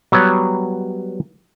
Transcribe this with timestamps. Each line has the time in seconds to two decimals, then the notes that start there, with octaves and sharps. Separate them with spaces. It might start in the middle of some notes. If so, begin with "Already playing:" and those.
0.12 F#3 G3 B3 C#5